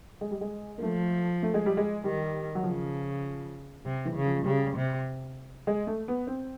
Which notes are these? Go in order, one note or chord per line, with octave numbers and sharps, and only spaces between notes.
G#3
G3
G#3
A#3
F3 A3
A3
G#3
G3
G#3
D#3 G3
F#3
C#3 F3
C3
E3
C#3
F3
C#3 G3
C3
G#3
A3
B3
C4